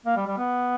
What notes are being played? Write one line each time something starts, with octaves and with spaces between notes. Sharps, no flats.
A#3
G3
G3
B3